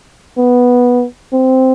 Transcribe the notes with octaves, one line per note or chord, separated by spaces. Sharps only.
B3
C4